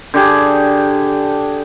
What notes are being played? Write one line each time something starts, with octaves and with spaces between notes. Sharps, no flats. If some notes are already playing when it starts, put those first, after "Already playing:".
D3 G4 G#4